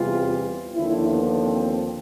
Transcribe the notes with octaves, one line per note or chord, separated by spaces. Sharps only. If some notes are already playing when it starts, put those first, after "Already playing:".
Already playing: E2 C3 E3 G3 F4
D#2 D3 F3 E4
B3
C4